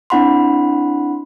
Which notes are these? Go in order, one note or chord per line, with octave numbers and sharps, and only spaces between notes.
C4 D4 E4 F#5 B5 C6